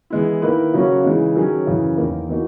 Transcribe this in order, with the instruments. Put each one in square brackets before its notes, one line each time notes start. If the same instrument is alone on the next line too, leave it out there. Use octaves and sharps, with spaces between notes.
[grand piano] E3 G#3 B3 E4
D#3 A#3 E4 B4
C#3 F#3 A#3 C#4 F#4
C#3 E3 G#3 D#4
D#3 F#3 C#4 G#4
F#2 C#3 E3
E2 D#3 A#3
E3 A#3 D#4 F#4